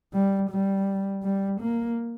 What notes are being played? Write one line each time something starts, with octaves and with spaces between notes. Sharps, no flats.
G3
G3
G3
A#3